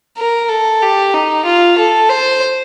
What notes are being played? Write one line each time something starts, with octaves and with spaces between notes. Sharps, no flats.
A#4
A4
G4
D#4
F4
A4
C5